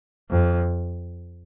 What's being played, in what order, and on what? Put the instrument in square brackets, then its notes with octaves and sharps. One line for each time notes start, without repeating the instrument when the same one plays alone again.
[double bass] F2